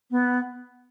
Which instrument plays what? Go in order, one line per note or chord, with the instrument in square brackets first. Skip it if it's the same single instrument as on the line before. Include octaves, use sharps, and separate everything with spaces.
[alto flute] B3